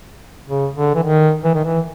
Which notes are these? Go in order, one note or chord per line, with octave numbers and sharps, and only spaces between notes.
C#3
D3
E3
D#3
E3
D#3
E3